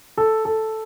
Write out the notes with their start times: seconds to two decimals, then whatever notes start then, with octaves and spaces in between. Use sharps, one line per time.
0.18 A4
0.45 A4